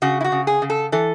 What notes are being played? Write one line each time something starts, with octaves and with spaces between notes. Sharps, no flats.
C#3 F#4
E4
F#4
C#3
G#4
C#3
A4
E3 A4